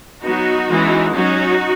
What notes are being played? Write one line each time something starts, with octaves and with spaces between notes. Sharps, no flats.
F#3 B3 D#4 F#4
E3 G#3 C#4
F#3 C#4 D#4 F#4